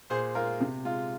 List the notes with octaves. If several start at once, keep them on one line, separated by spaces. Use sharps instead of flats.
A#2 G#4 C5
G#3 F4 A#4
C3
G#3 F4